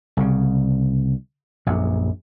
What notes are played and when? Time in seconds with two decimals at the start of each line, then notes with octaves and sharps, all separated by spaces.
0.17 C2 C#3
1.66 A#1 F#2 F#3